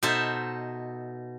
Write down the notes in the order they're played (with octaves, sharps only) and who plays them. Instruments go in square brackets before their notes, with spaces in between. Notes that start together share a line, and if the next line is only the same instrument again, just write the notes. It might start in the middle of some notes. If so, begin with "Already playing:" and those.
[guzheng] B2 D#4 A4 C5 E5 A5